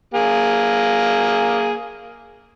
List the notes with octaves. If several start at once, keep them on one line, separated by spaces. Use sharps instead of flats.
A#3 G#4